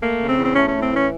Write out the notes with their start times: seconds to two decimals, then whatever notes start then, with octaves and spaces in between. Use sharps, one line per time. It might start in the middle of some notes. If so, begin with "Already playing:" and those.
0.02 A3 A#3
0.20 C#3
0.29 C4
0.37 E2
0.45 C4
0.55 A3 C#4
0.68 A2 C#4
0.82 C4
0.91 E3 C#4